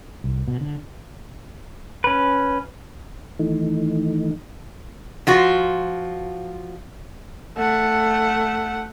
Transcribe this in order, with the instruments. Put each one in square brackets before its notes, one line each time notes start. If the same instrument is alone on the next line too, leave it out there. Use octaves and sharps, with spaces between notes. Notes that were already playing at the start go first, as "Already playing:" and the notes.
[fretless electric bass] C2
B2
D3
[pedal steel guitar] C#4 B4
[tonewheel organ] D#3 E3 A3 D#4
[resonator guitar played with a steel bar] F3 F4 F#4
[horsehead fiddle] A3 F#5